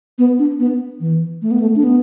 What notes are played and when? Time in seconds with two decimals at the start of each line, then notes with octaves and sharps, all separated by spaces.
0.19 B3
0.39 D4
0.60 B3
1.01 E3
1.42 A3
1.51 B3
1.60 A3
1.76 D4
1.84 B3